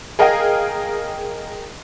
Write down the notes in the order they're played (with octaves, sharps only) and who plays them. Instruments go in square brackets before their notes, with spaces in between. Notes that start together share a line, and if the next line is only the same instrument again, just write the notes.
[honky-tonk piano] G#4 A#4 D#5 F5 G5